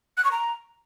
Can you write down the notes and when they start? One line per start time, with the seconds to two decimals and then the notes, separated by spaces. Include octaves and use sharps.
0.17 F#6
0.24 C#6
0.32 A#5